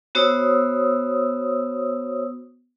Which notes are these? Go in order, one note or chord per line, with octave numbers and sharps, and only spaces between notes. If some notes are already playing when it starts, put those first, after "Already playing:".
B3 F#4 C5 C#5 D#6 E6